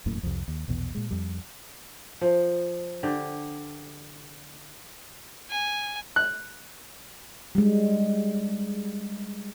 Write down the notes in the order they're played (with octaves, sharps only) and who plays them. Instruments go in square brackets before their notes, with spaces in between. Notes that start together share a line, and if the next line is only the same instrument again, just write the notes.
[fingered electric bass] E1 F#2 A2 A#3
C2 F2
D#2
A#1 E2 B2
A#2 G#3
F2 G3
[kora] F3
D3 G4
[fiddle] G#5
[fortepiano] F#6
[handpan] G3 G#3